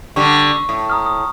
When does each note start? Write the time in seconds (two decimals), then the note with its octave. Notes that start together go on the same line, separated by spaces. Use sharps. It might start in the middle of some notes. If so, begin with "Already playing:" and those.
0.16 D3 G3 C#6
0.69 A2
0.90 A#5 D#6 F6
1.06 D#6